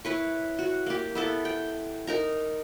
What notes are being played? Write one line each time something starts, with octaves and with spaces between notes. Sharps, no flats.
E4 B4 C#5
F#4
A#3 G4
B3 E4 A4
G5
D#4 A#4 A#5